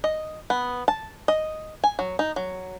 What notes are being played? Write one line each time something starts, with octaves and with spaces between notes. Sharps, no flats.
D#5
B3
A5
D#5
G#5
F#3
D#4
F#3